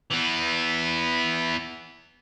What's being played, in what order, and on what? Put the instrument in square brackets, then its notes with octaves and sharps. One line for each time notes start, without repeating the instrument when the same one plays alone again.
[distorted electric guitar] E3 B3